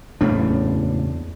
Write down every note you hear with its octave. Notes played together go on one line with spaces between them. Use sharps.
F#1 E2 A2 C#3 D4